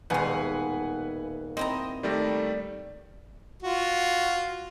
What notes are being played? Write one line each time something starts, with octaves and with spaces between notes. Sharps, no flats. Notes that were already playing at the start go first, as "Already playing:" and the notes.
D#1 B2 G#3 B4 F5 F#5 G#5
C4 E4 D#5 A#5
D#3 G3 A3 D5 A#6
F4 F#4